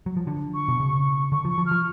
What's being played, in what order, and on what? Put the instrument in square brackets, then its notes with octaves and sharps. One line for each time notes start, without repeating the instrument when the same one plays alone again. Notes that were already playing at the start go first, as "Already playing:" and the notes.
[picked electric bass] F#3
F3
D3
[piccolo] C#6
[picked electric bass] B2
C#3
[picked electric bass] D3 [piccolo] C#6
[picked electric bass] F3 [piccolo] C#6
[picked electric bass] F3
[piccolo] F6
[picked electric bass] F3